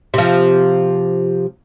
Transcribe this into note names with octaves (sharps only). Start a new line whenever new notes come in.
C3 F3